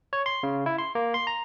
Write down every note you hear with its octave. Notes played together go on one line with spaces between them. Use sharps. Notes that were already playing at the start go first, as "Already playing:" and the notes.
C#5
C6
C#3
E4
C6
A#3
C6
A#5